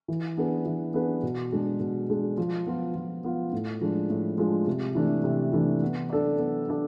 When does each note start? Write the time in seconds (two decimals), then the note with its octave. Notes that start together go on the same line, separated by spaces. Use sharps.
0.08 E3
0.37 B3 D4 G#4 B4
0.66 E3
0.94 B3 D4 G#4 B4
1.23 B2
1.52 G#3 D4 G#4
1.80 B2
2.09 G#3 D4 G#4
2.37 F3
2.67 B3 F4
2.95 F3
3.24 B3 F4
3.53 A2
3.81 F3 G#3 D4
4.10 A2
4.38 F3 G#3 D4
4.67 C3
4.95 E3 A3 D4
5.24 C3
5.53 E3 A3 D4
5.82 B3
6.10 D4 A4 D5
6.38 B3
6.68 D4 A4 D5